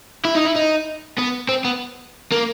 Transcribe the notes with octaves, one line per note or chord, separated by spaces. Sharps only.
E4
D#4
E4
D#4
B3
C4
B3
A#3